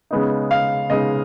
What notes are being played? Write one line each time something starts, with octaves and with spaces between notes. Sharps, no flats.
C#3 G#3 B3 D#4
F5
C#3 G#3 B3 D#4 D#5